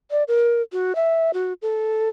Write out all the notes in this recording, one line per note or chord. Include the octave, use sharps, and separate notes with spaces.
D5
A#4
F#4
E5
F#4
A4